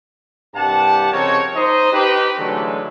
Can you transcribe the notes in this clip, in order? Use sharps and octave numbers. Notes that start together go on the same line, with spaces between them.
C2 G2 G4 F#5 A5
C#3 F3 C4 D#4 A#4 C#5
D#4 C5 D#5
D#4 G4 B4
D3 E3 F#3 G#3 A3